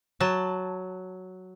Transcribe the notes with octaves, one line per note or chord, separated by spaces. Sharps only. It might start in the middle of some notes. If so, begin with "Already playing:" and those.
F#3 A5